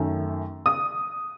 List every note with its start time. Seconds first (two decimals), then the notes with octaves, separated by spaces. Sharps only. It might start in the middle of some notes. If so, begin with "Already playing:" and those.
Already playing: F#2 D#3 A3
0.66 D#6